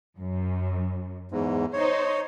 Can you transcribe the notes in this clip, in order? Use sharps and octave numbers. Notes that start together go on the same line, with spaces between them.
F#2
E2 G#2
D#4 C5 C#5